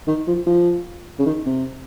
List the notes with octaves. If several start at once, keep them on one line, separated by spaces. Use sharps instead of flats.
D#3
F3
F3
C#3
D#3
C3